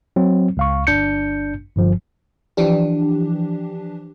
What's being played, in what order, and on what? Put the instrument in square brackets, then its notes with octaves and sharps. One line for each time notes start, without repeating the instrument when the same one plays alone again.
[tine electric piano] F#3 C4
C#2 F5 C#6
G1 D4 G6 C#7
G1 G2 F3
[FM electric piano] E3 F3 D4 G4